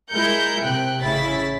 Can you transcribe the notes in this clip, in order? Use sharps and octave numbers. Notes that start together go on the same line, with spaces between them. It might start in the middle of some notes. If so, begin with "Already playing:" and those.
G#3 E4 A#4 G6 C#7
C3 G5 F#6
A1 C#3 E4 A6 B6